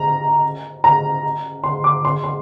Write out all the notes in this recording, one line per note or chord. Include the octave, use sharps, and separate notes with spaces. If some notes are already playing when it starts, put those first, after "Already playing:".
Already playing: A#5
A#5
C6
D6
C6
C6